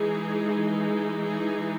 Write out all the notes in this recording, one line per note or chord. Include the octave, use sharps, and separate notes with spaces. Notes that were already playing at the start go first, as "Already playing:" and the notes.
Already playing: E3 G#3 D#4 G#4
G#4